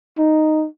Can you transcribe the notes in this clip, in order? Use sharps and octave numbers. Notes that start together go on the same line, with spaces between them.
D#4